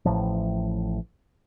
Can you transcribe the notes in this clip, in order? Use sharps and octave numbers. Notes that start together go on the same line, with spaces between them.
A1 A2 F3